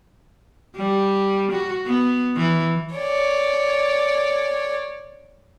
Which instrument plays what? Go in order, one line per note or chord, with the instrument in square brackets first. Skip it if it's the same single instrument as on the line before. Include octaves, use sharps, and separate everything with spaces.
[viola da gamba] G3
F#4
B3
E3
[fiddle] C#5 D5